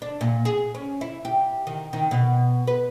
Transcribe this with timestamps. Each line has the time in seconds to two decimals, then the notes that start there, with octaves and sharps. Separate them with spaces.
0.02 D4
0.21 A#2
0.45 G#4
0.75 C#4
1.01 E4
1.25 G4
1.67 D#3
1.93 D#3
2.11 B2
2.67 B4